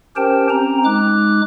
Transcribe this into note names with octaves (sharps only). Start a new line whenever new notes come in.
C#4 G4 A#4 C5 G5 A5
C4 C#4 A#5
G#3 D#4 D6 F#6